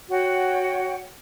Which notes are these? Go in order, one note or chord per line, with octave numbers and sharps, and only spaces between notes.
F#4 C#5 F#5 G5